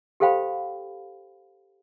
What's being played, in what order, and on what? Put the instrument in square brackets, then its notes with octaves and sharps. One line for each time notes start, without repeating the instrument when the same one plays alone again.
[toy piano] G4 A4 C5 F5 G5 B5